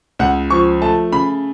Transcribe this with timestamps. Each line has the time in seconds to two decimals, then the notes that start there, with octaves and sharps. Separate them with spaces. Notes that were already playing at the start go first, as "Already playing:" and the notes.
0.19 C#2 F#5
0.50 F3 C#6
0.81 A3 A5
1.12 C#3 B5